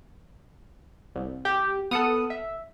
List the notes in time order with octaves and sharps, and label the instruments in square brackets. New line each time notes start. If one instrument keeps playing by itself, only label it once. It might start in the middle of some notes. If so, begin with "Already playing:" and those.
[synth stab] C2
[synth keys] G4
[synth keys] B3 D#6 [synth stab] A4 F#5 F6
[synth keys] E5